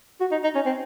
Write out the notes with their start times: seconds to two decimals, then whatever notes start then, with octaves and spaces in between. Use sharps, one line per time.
0.21 F#4
0.32 D#4
0.44 D#4
0.55 C#4
0.66 C4